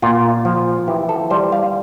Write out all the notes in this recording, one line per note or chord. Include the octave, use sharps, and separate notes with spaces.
A#2 F4
F3
E3 G4
A4
G3 C5
F5